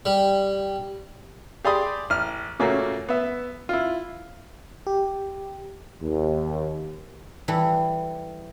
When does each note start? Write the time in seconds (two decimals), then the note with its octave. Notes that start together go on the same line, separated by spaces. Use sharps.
0.06 G3
1.65 G4 G#4 D5 B5 C6 D#6
2.10 A1 F6
2.59 A#2 C#3 A3 A#3 C#4 F#4
3.09 B3 E5
3.69 E4 F4
4.87 G4
6.02 D#2
7.48 E3 G3 A4